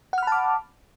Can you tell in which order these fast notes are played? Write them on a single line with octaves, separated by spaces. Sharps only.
F#5 F6 B5 A5 D6